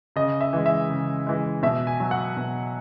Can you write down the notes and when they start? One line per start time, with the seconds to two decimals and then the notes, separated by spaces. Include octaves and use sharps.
0.16 C#3 D#5
0.41 E5
0.53 E3 G#3
0.66 E5
0.90 C#3
1.27 E3 G#3
1.63 B2 E5
1.87 G#5
2.00 F#3
2.11 F#5
2.37 B2